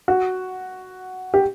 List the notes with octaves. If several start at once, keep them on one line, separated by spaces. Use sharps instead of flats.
F#4
G4